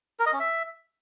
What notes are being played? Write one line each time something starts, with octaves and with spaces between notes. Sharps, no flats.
A#4
D#5
C#4
E5